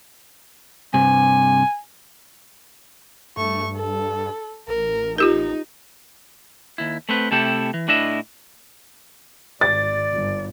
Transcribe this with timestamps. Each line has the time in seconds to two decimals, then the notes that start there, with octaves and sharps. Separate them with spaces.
0.94 G2 C3 G#5
3.37 G2 A3 C#6
3.76 A4
4.68 A1 A#4
5.18 D#4 F4 G4 A#4
6.78 D#2 E4
7.09 A3 C4 B4
7.31 C3 A3 E4 G4 A4
7.74 E3
7.88 A2 D4 E4 D#5 E5
9.61 G#1 D5 A6
10.12 G1